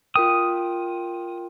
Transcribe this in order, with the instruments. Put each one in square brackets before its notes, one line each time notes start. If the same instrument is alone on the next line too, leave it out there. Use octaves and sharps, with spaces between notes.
[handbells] F4 A#4 G5 [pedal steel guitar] D#6